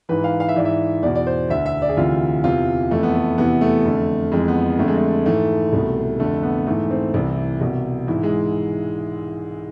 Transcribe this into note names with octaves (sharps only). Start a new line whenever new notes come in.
G#2 E3 B4
F5
F5
E5
G#2 E3 D5
E5
E2 B2 D5
D5
C5
D2 D3 E5
E5
D5
G#4
D2 C3 E3 F4
E2 C3 E3 F4
F2 E3 A3
B3
A3
E2 C3 E3 B3
A3
F2 D3
F2 E3 G#3
B3
F2 D3 A3
G#3
A3
G#2 E3 A3
C2 B2
F2 D3 A3
B3
G#2 E3 A3
C4
C2 C3 E3
C2 B2
G#2 E3 E4
G#3